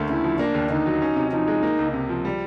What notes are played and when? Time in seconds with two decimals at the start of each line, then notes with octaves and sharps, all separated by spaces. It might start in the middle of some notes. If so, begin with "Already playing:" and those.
Already playing: D2 A3 A#3
0.09 C#3 E4
0.24 F3
0.39 A#3 D4
0.54 D#2
0.70 D3 D#4
0.86 F#3
1.02 C#4
1.16 C3
1.32 F3 D#4
1.47 G#3
1.63 A#3
1.79 C#2
1.94 C3
2.09 F3
2.25 G3